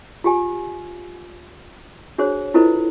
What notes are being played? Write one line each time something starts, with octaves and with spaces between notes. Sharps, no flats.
F4 G4 G#5
D4 F#4 G#4 C5 C#5
E4 F4 A4 B4 C5 D#5